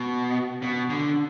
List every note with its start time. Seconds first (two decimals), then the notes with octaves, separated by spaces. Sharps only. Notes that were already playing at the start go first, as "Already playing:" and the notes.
Already playing: B2
0.62 B2
0.90 D3